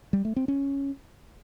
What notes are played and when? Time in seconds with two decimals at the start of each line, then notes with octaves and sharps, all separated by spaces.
0.13 G3
0.25 A3
0.36 C4
0.48 C#4